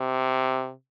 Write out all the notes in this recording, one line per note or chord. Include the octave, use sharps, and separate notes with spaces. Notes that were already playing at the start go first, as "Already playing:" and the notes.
Already playing: C3